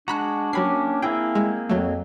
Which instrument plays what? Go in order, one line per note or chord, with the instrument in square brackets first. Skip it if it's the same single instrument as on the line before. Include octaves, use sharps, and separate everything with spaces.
[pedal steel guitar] G#3 F#4 [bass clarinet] D4 [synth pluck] A#5 B5 F#6
[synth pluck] F#3 B5 C7 [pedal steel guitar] A#3 C#4 G4
[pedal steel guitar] A#3 C4 G#4 [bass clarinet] E4 [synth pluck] G5
[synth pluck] G#3
[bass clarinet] F2 [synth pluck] F#3 A3